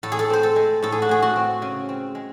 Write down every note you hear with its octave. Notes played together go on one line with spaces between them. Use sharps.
A2 A4
G#4
A4
C4 C5
A4
G#3
A2 A4
G#4
F#4
A2 G#4
F#4
C4
C#3
C4
G#3